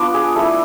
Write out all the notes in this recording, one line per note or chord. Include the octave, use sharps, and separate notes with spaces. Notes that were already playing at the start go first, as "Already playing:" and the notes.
Already playing: B3 D4 F4 B4 D5
G#4
A3 E4 A4